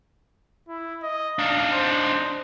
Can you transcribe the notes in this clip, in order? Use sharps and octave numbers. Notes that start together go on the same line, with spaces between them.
E4
D#5
D4 D#4 F5
C5